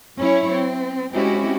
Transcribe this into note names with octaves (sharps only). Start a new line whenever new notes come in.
F#3 C#4 E4 C#5
C4
G#3 C4 C#4 E4 F#4 G4